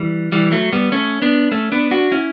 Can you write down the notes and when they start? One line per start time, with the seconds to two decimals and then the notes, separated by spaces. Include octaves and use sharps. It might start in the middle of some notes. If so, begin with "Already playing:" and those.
Already playing: E3 G3
0.32 E3 G3
0.52 F#3 A3
0.73 G3 B3
0.92 A3 C#4
1.22 B3 D4
1.52 A3 C#4
1.72 B3 D4
1.91 D4 F#4
2.11 C#4 E4